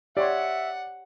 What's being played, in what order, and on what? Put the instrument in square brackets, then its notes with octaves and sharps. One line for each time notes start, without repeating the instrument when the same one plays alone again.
[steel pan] G4 C#5 C6 [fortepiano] D5 [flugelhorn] E5 [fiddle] F#5